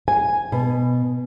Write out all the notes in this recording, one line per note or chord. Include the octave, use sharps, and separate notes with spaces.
G#5
B2